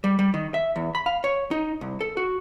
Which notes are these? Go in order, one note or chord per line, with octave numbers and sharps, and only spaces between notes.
G3
G3
D#3
E5
E2
B5
F5
C#5
D#4
C2
A4
F#4